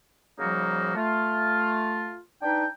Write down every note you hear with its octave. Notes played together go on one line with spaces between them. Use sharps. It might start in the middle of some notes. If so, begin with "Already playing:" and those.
C#3 F3 G3 A#3 D#4 F#4
A3 F4
D4 D#4 B4 G5